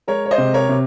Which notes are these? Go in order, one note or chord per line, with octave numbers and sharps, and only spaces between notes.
G#3 A#4 C#5
C#5
C5 D#5
C3
A#4 C#5
C3